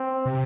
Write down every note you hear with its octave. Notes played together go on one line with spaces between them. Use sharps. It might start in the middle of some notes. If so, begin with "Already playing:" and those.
Already playing: C4
C3